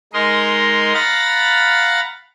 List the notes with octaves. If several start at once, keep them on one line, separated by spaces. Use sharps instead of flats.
G#3 D#4 A#4 D#5 C6
F5 F#5 A#5 B5 A6